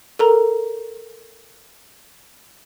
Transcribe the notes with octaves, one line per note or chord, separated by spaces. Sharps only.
A4 A#4 A#5